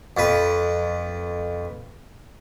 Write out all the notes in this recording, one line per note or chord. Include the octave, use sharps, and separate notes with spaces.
F2 B4